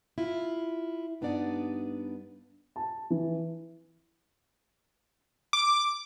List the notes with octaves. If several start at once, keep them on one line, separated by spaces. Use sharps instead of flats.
E4 F4
G2 B3 D4 D#4 D5 F#5
A5
E3
D6